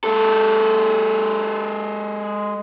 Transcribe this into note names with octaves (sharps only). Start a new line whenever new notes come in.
G#3 A4